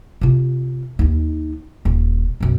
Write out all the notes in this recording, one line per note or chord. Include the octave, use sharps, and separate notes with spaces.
C3 F4
D#2 D#4
D#1
B1 F#2